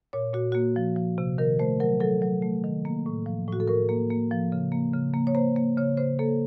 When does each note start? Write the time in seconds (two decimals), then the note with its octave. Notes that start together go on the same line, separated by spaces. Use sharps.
0.13 A#2 C#5
0.34 A#2 F#4
0.52 A#3 F#4
0.76 F3
0.97 F3
1.18 C3
1.38 D#3 A#4
1.59 A3 C5
1.80 F#3 A#4
2.00 F#3 A4
2.22 F#3
2.42 A3
2.64 D#3
2.85 A#3
3.06 A2
3.26 F3
3.48 A2 F#4
3.60 A4
3.68 A2 A#4
3.89 A#3
4.11 A#3
4.31 F3
4.52 C#3
4.72 A#3
4.93 C#3
5.14 A#3
5.27 C#5
5.35 A#3 C5
5.56 A#3
5.78 C#3 C#5
5.97 C#3 C5
6.19 A#3 A4